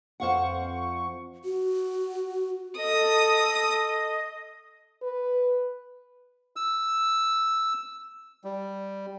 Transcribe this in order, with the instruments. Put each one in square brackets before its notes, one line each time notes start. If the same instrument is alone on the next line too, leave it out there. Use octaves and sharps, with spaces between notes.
[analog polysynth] F2 C#6 [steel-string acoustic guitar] C5 F5 F#5
[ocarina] F#4
[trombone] A4 [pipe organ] D#5 [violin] D#6
[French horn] B4
[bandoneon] E6
G3